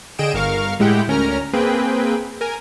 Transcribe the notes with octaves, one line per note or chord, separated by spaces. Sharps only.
D3 G#4 D#5 G5 D7 E7
G1 A#4 F5 C#6 F6
A2 G#3 E4 G4 F#5 G5
D2 C#4 A#4 A#5 F6
A#3 C4 G#4 B4 G5
A#4 G#5